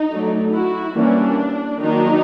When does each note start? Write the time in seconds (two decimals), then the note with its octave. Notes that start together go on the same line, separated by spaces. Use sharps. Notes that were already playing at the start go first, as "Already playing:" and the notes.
Already playing: D#4
0.11 F#3 A3 D4
0.53 E4 F#4
0.96 E3 G3 A#3 C#4 D4
1.81 D#3 F#3 A#3 D4 D#4